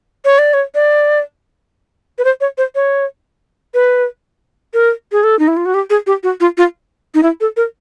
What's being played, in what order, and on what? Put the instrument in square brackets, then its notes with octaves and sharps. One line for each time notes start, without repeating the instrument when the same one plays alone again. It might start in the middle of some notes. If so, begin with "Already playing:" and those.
[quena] C#5
D5
C#5
D5
B4
C5
C#5
C5
C#5
B4
A#4
G#4
A4
D#4
E4
F4
F#4
G4
G#4
G4
F#4
F4
F4
D#4
E4
A4
A#4